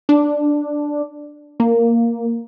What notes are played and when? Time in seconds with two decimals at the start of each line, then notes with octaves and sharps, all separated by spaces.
0.09 D4
1.60 A#3